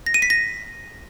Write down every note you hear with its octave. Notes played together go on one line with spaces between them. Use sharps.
A#6
D#7
B6
A#6